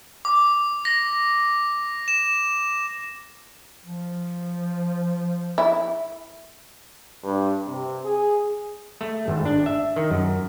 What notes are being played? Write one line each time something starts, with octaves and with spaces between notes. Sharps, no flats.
D6
A#6
E7
F3
E4
G2
C3
G#4
A3
G#1
D4
E5
D#3
F#2